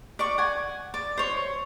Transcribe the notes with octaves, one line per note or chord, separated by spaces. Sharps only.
D5 C#6
F#5 G#5
D5
C5 C#5